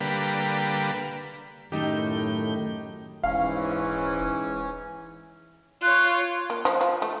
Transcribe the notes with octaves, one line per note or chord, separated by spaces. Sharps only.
D3 G3 A#3 B4
F#2 A2 D#3 A3 D#4 G4 A4 G6
D#1 G#2 E3 C#4 F5
F4 C#5 F#6
A#3
F3
F3
A3